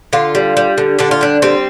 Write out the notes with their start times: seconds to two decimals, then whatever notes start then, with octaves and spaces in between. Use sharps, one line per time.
0.13 D3 F4
0.35 G3
0.57 G3
0.78 D3
0.99 D3 D4
1.11 F4
1.21 G3 D4
1.42 G3 C4